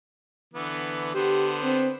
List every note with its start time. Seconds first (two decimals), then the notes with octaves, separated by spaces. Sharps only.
0.54 D3 E3 B3
1.15 D3 B3 G4 C5
1.63 C4